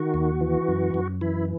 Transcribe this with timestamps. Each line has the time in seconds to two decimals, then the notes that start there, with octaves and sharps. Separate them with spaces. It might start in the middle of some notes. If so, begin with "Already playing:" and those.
Already playing: D#3 F#4
0.14 D#2
0.41 E3
0.68 F#2
0.94 F#2
1.21 E3 E4